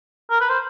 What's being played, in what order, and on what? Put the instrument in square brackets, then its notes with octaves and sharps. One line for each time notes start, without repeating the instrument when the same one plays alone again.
[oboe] A#4
B4
C5